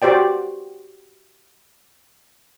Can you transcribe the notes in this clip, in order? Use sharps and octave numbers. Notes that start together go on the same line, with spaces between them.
F#4 G4 C5 D5 G5